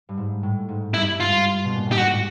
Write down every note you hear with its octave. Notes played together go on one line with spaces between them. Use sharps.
G2
G#2
A2
G#2
G2 E4
F4
B2
A#2
A2
G4
G#2 F#4